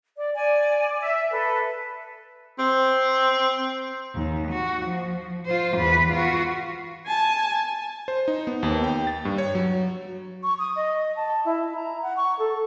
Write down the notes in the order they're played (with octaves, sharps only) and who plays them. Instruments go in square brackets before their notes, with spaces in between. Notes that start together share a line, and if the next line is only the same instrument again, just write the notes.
[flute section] D5
D5 G#5
E5
A4 B4
[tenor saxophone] C4
[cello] D#2
F#4
F3
F4 C5
E2 B4
F4 F#4
[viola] G#5 A5
[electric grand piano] C5
D#4
B3
D#2
G5
A6
G2
C#5
F#3
[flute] C#6
D#6
D#5
A5
E4
A#5
F#5
C#6
A4